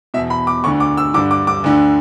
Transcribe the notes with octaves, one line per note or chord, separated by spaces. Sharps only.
E2 B2 E5
B5
D6
D2 D3 C#6
D6
E6
G2 D3 D6
D6
D6
D2 D3